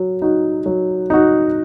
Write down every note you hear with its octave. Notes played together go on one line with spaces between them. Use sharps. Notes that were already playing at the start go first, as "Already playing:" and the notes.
Already playing: F#3
D#4 F#4
F#3
D#4 F#4